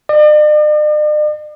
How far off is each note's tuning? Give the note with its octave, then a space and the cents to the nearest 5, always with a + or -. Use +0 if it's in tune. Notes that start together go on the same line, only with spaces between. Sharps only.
D5 +45